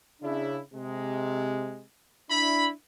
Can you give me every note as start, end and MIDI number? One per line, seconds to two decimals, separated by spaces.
0.22 0.60 49
0.22 0.60 62
0.22 0.60 64
0.74 1.83 48
0.74 1.83 56
2.30 2.72 62
2.30 2.72 64
2.30 2.66 83